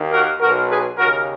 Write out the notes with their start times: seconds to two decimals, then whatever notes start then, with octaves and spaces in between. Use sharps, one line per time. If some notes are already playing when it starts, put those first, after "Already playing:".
Already playing: D#2 D#3
0.13 F#4 A#4
0.41 B1 B2 F#4 A#4
0.69 G#4 B4
0.98 D#2 C#3 F#4 A#4